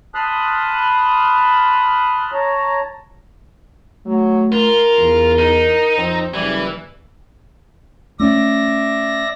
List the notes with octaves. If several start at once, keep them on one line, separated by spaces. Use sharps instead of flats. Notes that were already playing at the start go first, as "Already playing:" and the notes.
A5 B5 C6 D#6 F6 F#6
C#5 A5 A#5
F#3 A3
F4 A#4
E2
D#4
F2 C4
F#1 E3 G3
A3 C#4 D5 E5 A#6